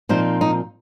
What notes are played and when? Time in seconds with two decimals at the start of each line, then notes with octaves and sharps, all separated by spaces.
0.09 A#2 F3 C4 D#4 C5
0.41 D#4